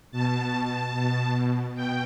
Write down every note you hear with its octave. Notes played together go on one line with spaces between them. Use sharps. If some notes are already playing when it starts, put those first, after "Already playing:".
B2 A5
B2
B2 G5